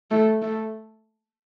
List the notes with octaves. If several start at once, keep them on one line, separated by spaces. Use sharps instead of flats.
A3
A3